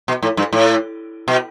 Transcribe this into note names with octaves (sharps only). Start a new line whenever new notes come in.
B2
A2
G2
A2
B2